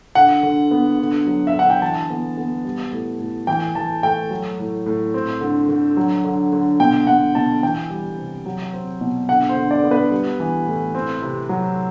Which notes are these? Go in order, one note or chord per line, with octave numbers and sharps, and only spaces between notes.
D3 F#5
D3
B3
D3
F#3
E5
D3
F#5
G5
E3 A5
B3
B3
G3
A2
A2
E3 G5
E3 A5
A3 G5
F#3
A2
A2
C4
D3
D3
F#3
D3
D3
B2 G5
B2 F#5
B2 A5
E3 G5
G3
C3
F#3
C4
B2
D3 F#5
C5
D3
D5
B3
B4
G3
E3
A2
C4
C3
F#3